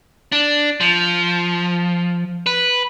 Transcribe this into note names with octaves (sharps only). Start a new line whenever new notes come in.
D4
F3
B4